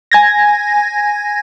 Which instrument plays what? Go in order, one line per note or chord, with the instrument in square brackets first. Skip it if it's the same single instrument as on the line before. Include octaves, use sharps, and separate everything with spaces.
[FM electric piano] G#5 G#6 A#6